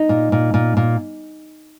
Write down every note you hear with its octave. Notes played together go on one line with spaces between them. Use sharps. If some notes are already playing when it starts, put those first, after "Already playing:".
Already playing: D#4
A#2
A#2
A#2
A#2